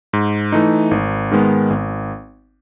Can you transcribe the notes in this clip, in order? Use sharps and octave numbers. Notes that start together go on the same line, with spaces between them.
G#2
E3 A3 D#4
G#1
G#2 D#3 G#3 B3
G#1